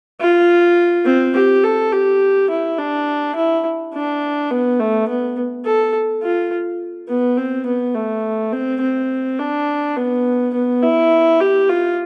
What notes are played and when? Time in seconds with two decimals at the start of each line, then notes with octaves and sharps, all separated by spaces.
0.20 F4
1.05 C4
1.35 G4
1.63 A4
1.92 G4
2.50 E4
2.78 D4
3.36 E4
3.94 D4
4.51 B3
4.79 A3
5.08 B3
5.65 A4
6.23 F4
7.08 B3
7.37 C4
7.66 B3
7.95 A3
8.53 C4
8.81 C4
9.39 D4
9.97 B3
10.54 B3
10.82 E4
11.40 G4
11.69 F4